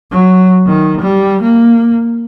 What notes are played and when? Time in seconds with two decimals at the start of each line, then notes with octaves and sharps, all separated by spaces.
0.11 F#3
0.66 D#3
1.01 G3
1.41 A#3